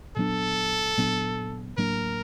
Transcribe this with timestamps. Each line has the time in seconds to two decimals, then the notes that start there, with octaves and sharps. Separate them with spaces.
0.16 A#2 F#3 B3 D4 A4
0.98 A#2 F#3 B3 D4
1.78 A2 F#3 A#3 D4 A#4